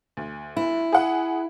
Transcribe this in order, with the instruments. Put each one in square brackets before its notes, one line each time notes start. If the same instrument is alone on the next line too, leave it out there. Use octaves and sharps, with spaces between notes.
[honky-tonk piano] D2
[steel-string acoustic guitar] E4
[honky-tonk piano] G#4 F#5